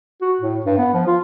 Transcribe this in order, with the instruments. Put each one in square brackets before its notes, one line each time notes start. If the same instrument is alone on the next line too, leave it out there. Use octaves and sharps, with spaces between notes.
[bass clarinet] F#4
A2
G2
B3
F3
F4